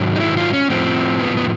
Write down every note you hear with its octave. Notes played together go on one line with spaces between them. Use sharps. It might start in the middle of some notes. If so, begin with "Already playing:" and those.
Already playing: G#2 D#3 F#3
D#4
E4
F4
C#4
A2 F3 C4
B3
B3